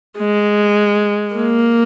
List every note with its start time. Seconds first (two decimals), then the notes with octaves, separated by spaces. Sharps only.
0.19 G#3
1.35 A#3